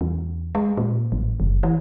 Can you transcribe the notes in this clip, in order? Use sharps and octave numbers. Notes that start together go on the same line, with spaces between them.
E2
G#3
A#2
A1
F#1
E3